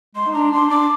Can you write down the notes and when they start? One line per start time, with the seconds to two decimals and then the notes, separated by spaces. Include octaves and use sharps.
0.15 G#3 C6
0.27 D#4
0.34 D4 A#5
0.52 D4 C6
0.70 D4 D6